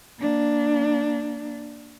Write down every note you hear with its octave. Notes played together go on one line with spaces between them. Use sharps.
A#3 D4